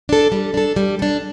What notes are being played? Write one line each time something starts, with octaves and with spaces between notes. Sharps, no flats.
D4 A4
G3
D4 A4
G3
D4 A4